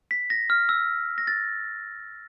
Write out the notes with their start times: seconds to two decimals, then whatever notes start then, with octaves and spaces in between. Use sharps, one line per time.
0.11 B6
0.30 A#6
0.50 F6
0.69 E6
1.18 A#6
1.27 A6